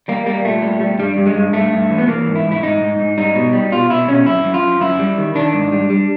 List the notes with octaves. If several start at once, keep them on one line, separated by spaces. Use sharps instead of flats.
G3 A#3
G3 A#3
A#2 A3
G3
G3
G2 G3
G2
G#3
G2
G2 A3
G2
E3
B3
E3 A#3
G#2
E4
G#2
E4
G#2 D#4
G#2
G#2
G3 D#4
B2
G3
B2 F4
B2 E4
B2 C#4
F#2 E4
F#2
F4
F#2
F#2 E4
G3
D#3
D#3 D4
G#2
G3
G3